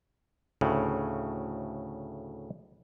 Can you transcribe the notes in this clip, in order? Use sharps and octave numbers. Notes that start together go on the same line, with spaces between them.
D2 A2 C#3